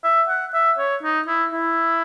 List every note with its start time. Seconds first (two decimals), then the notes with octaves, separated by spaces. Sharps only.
0.04 E5
0.29 F#5
0.54 E5
0.78 C#5
1.03 D#4
1.27 E4
1.52 E4